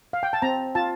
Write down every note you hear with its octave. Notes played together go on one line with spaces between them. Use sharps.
F5
G5
A5
C4 A#5
F4 A5